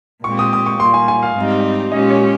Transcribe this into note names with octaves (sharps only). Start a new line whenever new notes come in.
A#2 G#3 C4 G4 C#6
D#6
D#6
C#6
A#2 G3 A#3 C6
G#5
G#5
F5
G#2 G3 C4 D#4 G4
A#2 G#3 C#4 G4 D#5
C#5